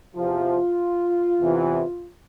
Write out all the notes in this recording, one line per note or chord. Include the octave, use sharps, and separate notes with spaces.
E2 C3 F3 F4
E2 C3 E3